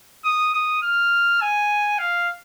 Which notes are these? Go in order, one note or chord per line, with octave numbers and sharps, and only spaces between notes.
D#6
D#6
F6
G#5
F5